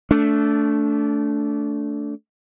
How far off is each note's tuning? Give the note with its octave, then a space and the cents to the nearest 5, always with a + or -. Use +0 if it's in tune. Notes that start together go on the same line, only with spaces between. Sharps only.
A3 +0 D4 -25